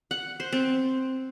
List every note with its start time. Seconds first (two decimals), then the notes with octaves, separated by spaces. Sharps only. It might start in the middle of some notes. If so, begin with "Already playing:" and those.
0.11 F#5
0.40 C5
0.52 C4